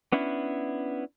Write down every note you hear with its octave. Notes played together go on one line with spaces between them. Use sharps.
B3 C#4 D4 E4